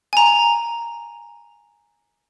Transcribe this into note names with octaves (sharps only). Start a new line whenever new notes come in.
G#5 A#5